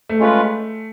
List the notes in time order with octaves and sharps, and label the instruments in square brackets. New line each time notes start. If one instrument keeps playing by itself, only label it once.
[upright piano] A3
[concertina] G#3 C#4 F4 B4